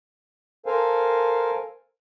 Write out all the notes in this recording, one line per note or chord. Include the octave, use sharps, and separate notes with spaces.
A4 A#4 C5 F5 G#5